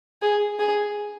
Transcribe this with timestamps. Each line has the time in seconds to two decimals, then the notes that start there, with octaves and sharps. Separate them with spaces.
0.22 G#4
0.59 G#4